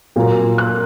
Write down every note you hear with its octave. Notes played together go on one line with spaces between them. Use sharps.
A#2 F#3 A#3
F#6